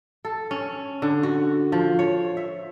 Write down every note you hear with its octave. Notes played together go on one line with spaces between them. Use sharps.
A4
C#4
D3
F#4
F3
C#5
E5